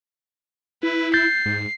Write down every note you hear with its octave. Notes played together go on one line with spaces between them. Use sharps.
E4 B4
G6 A6 C7
G#2